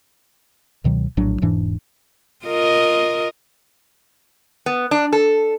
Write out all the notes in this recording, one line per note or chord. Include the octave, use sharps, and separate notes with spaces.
C#2 B2 D#3 F#3
A#1 A2 F#3 D4
E1 G#2 E3 D4
F4 A#4 D#5
B3
D4
A4